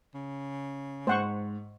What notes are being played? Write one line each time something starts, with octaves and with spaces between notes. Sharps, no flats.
C#3
G#2 C5 F#5 C#6